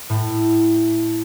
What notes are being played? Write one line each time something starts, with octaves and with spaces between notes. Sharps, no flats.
A2